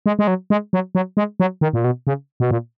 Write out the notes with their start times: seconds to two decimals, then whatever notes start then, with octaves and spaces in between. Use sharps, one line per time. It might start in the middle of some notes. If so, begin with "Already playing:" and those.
0.06 G#3
0.19 G#3
0.27 F#3
0.50 G#3
0.73 F#3
0.95 F#3
1.17 G#3
1.40 F#3
1.61 D#3
1.73 A#2
1.84 B2
2.07 C#3
2.40 B2
2.51 A#2